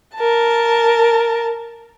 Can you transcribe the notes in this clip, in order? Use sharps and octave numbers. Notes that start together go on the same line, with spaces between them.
A#4 A5